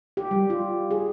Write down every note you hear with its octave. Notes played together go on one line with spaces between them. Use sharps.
G4
G3
F4
G#4